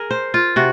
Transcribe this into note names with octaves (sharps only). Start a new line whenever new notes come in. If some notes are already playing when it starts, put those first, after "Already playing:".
Already playing: G#4 A#4
C5
F4
C3 F#4